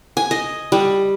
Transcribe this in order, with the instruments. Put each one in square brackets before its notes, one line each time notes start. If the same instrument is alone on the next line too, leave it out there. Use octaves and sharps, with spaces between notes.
[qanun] G#5
D#5
G3